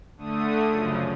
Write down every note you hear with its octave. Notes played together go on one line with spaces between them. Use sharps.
D3 A3 D#6
F#2 C#3 F3